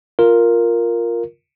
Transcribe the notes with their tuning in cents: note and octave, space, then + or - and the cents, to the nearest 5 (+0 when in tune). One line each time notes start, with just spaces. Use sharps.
F4 +0 A#4 +0